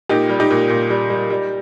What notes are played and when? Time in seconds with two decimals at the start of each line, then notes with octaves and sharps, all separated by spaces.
0.09 A#2 D#4 G4
0.30 G3
0.40 D#4 G4
0.51 A#2
0.69 A#2
0.90 G3
1.10 G3
1.30 G3